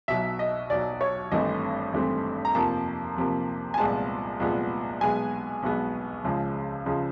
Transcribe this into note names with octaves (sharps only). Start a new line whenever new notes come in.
B1 B2 F#3 E5
D#5
B1 B2 F#3 D5
C#5
G#1 G2 E3 A3 C4 D#5
G#1 G2 E3 A3 C4
A#5
F2 C3 F3 A#3 A5
F2 C3 F3 A#3
G#5
C2 A#2 F3 G#3 B3 A5
C2 A#2 F3 G#3 B3
B1 B2 G#3 B3 G#5
B1 B2 G#3 B3
C#2 C#3 F3 G#3
C#2 C#3 F3 G#3